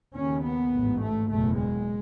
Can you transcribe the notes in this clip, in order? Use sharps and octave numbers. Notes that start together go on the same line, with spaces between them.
D#2 C#3 C#4
B3
A1 G#2
A3
F#1 E2 B2 A3
G#3